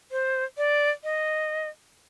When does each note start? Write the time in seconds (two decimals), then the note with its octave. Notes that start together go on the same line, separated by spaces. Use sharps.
0.11 C5
0.57 D5
1.04 D#5